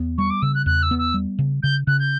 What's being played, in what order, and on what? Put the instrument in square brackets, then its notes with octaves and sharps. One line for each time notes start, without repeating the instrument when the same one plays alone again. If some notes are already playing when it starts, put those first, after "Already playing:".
Already playing: [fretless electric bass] E2 B3
[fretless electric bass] G3 [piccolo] C#6
[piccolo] D6
[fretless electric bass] C#3 [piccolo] E6
[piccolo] F#6
[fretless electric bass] E2 [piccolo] F#6
[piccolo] E6
[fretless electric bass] B3
[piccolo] E6
[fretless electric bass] G3
C#3
[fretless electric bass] C#3 [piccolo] G6
[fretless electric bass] C#3 [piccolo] F#6
[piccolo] G6